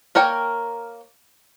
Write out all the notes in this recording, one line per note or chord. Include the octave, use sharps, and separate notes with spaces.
A#3 A#4 C#5 G5